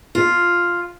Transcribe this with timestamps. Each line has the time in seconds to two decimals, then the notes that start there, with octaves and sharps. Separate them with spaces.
0.15 F4